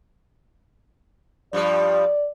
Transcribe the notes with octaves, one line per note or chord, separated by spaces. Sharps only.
G2 F3 G3 D5